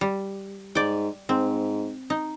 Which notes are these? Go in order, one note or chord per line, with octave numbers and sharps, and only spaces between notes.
G3
G#2 D5 G5
G#2 C4
D#4